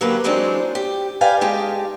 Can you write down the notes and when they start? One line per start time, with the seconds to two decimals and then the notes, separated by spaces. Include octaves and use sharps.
0.01 D3 F#3 A#3 B3 G4 B4
0.24 E3 F#3 G#3 C4 D4 D#4
0.75 G4
1.21 B4 D5 F5 G5 G#5
1.41 G#3 D#4 G4 A5